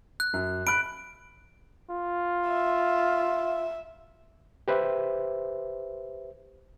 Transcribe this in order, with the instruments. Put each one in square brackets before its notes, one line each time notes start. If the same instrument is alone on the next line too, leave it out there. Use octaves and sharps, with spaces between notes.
[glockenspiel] F#6
[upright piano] F#2
[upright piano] B5 F#6 [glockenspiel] D7
[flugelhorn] F4
[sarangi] E5
[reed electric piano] G4 B4 C5 E5